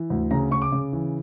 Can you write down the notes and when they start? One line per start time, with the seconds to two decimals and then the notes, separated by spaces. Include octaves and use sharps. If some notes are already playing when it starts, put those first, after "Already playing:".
Already playing: E3
0.10 D2
0.31 C#3 A#5
0.51 C#3 C#6
0.62 D6
0.72 C#3
0.93 E3